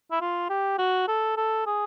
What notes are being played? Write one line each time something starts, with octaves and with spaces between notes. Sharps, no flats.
E4
F4
G4
F#4
A4
A4
G#4